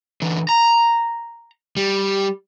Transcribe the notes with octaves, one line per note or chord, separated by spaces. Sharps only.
D3 E3
A#5
G3